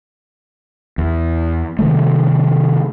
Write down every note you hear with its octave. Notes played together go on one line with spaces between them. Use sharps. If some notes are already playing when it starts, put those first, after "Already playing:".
E2
C3 D#3 A3